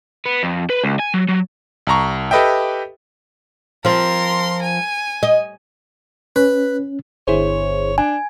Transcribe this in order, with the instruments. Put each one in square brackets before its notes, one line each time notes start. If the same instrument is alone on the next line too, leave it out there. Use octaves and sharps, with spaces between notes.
[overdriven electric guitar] B3
F2
B4
C#2
G#5
F#3
F#3
[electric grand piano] C2 A5 A#5 C#6
G4 A4 B4 D#5 E5 G5
[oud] F3 C4 [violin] A#4 C6
[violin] G#5
[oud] D#5
[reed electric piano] C#4 [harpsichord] B4
[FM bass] G1 [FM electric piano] E4 G#4 C5 [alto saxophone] C#5
[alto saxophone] D4 [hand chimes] G#5